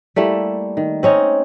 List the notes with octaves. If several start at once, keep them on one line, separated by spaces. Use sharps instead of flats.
G3 A3 A#3 E4
D#3
C4 C#4 D#4